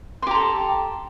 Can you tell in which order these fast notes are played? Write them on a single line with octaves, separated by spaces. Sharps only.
C6 G4 A#5 A4